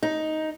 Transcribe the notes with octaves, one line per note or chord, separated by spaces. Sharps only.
D#4